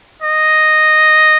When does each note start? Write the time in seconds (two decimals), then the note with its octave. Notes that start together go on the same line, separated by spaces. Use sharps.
0.22 D#5